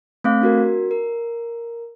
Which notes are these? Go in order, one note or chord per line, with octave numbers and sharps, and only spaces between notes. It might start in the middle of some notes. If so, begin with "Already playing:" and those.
A3 C4 F5
D4 F#4 A#4
A#4